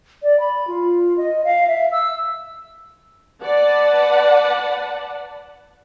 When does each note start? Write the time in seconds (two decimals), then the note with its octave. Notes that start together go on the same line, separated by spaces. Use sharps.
0.23 D5
0.40 B5
0.67 F4
1.18 D#5
1.44 F5
1.68 E5
1.92 E6
3.42 B4 D5 F#5 A5